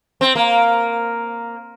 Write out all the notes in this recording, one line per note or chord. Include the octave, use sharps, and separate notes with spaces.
C4
A#3